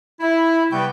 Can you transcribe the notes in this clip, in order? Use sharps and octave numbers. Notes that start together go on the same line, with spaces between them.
E4
C3 G3 B3 B4 G5 C#6